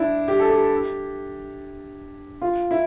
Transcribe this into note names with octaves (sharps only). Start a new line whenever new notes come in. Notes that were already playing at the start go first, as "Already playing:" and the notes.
Already playing: D4 E4
G4
A4
G4
F4
E4